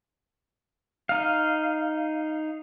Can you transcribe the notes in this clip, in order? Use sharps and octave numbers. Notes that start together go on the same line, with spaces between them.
D#4 F5